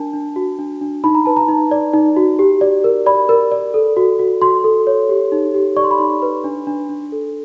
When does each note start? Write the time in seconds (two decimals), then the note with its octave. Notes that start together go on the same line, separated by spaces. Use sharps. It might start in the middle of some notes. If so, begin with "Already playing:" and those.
Already playing: D4 A#4 A5
0.14 D4
0.36 F#4
0.59 D4
0.81 D4
1.04 D#4 B5
1.15 A#5
1.25 B4 A5
1.37 A#5
1.48 D#4
1.71 D5
1.94 D#4
2.17 F#4
2.39 G4
2.61 D5
2.84 A#4
3.06 D5 B5
3.29 A#4
3.52 D5
3.74 A4
3.97 F#4
4.19 F#4
4.42 F#4 C6
4.64 A4
4.87 C#5
5.09 G4
5.32 D#4
5.54 G4
5.76 D5 C#6
5.84 C6
5.91 B5
5.98 D#4 C6
6.22 B4
6.44 D4
6.67 D4
6.89 D4
7.12 A4